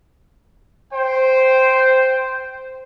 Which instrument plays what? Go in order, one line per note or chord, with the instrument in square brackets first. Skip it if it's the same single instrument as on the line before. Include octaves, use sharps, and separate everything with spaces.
[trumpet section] C5 G5